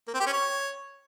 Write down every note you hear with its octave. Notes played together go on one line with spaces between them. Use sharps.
A#3
C4
G4
C#4
C#5